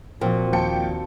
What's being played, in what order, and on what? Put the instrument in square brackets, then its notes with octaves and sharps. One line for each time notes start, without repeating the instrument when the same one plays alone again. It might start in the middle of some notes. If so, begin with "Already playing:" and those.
[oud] A#2 [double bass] F3 [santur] C4 F#4
[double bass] D#2 [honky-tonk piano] F3 G5 C#7 [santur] A5